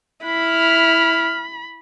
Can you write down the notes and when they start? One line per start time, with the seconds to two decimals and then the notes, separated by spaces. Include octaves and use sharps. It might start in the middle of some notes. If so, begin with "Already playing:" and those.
0.25 E4 B5 F6